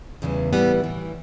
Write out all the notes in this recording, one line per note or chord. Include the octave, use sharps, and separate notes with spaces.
E2 C#3 E3 G3
A2 E3 G3 B3
A2 E3 G3